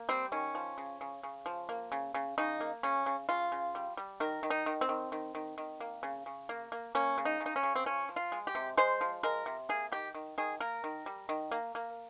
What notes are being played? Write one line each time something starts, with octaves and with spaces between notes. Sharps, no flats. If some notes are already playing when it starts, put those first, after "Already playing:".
Already playing: A#3
G3 C4
D#3 C#4
F3
C#3
C#3
C#3
F3
A#3
C#3
C#3
C#3 D#4
A#3
C#3 C#4
C#3
C#3 F4
C#3
G3
G3
D#3 A#4
D#3
D#4
D#3
C4
D#3
D#3
D#3
D#3
A#3
C#3
C#3
A#3
A#3
A#3 C#4
C#3
D#4
C#3
D#4
C#4
C#3
C4
F3 C#4
F3
F4
G#3
G4
C3
G#3 C5
F3
G#3 A#4
C3
A#3 G#4
D#3 G4
D#3
D#3 G#4
A#3 A#4
D#3
G3
D#3
A#3
A#3